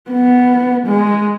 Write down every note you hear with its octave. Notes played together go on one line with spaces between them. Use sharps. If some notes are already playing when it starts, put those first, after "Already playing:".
B3
G#3